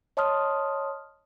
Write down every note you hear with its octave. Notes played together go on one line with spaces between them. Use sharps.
C#5 D#5 A5 C6 D#6 F6